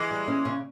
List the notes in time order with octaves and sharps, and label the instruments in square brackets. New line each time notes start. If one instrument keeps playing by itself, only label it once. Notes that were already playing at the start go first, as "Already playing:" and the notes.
Already playing: [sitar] E3 G#3
[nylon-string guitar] G3
C#4
C#3